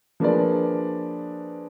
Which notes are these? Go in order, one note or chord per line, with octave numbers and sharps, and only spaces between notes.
F3 A#3 D4 G#4 B4 D5